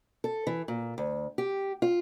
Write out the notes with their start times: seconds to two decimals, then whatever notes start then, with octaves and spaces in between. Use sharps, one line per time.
0.24 A4
0.47 E3
0.68 A#2
0.98 D2
1.38 G4
1.82 F4